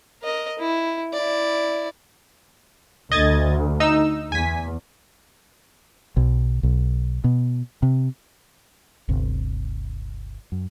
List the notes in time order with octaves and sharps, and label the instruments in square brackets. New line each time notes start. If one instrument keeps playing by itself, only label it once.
[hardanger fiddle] A#4 D#5
E4
E4 D5
[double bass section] D2 [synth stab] D#5 G#6 A6
[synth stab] D#4 E6
[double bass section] E2 [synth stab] G#5 B6
[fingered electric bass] B1
B1
B2
C3
[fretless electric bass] G1 D2 C3
F#2